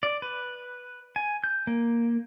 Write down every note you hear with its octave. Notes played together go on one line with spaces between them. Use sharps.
D5
B4
G#5
G6
A#3